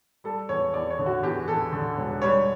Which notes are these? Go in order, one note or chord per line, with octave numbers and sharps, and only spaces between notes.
G3 A4
E2 C#5
E2 D5
C#5
D3
F#4
E2 G4
E2 A4
D3
E1
G3 C#5